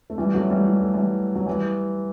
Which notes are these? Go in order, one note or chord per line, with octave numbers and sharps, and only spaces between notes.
A3
E3 G3
F#3 A3
E3 G3
G3
A3
E3 G3
F#3
E3 G3